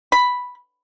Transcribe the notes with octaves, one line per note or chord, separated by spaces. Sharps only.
B5